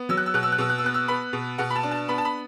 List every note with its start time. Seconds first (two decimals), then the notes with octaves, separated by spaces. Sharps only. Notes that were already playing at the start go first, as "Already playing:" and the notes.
Already playing: B3
0.09 F#3 E6
0.17 F#6
0.26 E6
0.34 B2 F#6
0.43 E6
0.52 F#6
0.58 B2 E6
0.70 F#6
0.78 E6
0.84 B3 F#6
0.94 E6
1.08 B3 B5
1.33 B2
1.58 B2 F#5
1.70 B5
1.76 A5
1.83 D4
1.91 A5
2.08 B3 B5
2.18 A5
2.25 B5